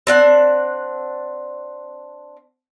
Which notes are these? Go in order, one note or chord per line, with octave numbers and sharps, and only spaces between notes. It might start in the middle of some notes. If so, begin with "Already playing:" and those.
C4 D4 F#5